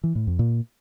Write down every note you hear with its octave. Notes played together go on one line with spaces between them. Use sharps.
E3
A2
F2
A#2